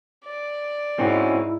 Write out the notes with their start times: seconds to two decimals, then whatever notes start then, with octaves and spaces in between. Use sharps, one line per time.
0.25 D5
0.99 G#2 C4 C#4 E4 F#4